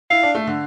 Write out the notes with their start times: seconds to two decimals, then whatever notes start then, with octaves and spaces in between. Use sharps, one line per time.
0.10 E4 F5
0.23 D4
0.35 A3
0.47 D3